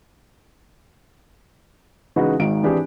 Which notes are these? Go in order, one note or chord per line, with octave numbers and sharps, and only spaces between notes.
C#3 E3 G#3 D#4 F#4 B4
G#1 G#2 D#3 D7
E3 C4 D4 G4 G#4